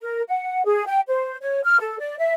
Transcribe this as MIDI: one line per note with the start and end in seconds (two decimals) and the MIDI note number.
0.02 0.22 70
0.28 0.65 78
0.65 0.84 68
0.87 1.00 79
1.08 1.36 72
1.41 1.60 73
1.64 1.77 89
1.80 1.98 69
1.99 2.15 74
2.19 2.34 76